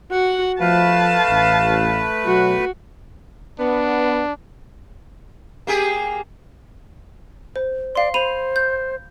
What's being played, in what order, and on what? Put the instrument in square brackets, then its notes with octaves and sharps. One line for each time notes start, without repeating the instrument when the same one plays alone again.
[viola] F#4 [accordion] F#5
[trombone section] F3 [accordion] A3 B4 [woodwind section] F5 [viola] A5
[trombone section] A1
[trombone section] B2 F#3 [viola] F#4
[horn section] B3 [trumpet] D4
[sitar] A#3 G4 G#4
[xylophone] C5
[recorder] D5 [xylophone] F5 C6
[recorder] C5 [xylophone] B5 D#7 F7
[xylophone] G6